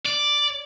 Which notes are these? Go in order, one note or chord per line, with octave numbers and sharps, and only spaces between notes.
D5